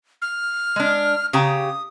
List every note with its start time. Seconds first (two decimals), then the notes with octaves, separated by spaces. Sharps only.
0.22 F6
0.76 G#3 D4
1.33 C#3 G4 A#5 D#6